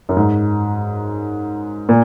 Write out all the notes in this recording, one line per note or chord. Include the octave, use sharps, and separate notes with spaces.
F#2
G#2
A#2